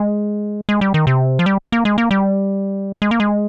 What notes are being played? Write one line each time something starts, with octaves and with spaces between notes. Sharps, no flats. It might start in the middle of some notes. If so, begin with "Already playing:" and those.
Already playing: G#3
G#3
G3
D#3
C3
F3
G3
A#3
G#3
A#3
G3
G#3
A#3
G#3